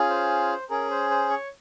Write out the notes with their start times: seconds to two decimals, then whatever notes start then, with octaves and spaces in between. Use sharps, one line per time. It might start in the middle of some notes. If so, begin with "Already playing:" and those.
Already playing: C#4 F4 G#4
0.10 C5
0.70 C#4 G#4 A#4
0.91 C5
1.10 C5
1.30 C#5